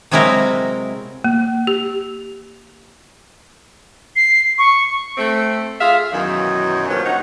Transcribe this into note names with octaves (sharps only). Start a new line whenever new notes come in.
C3 F#3 G#3 C4 E4 A#4
A#3
G4
C7
C#6
A3 C4
F4 G#4 E5 F5
F#2 B2 D#3 E3 F#3
G2 F3 F#3 A#3
C3 D#4 C#5 F#5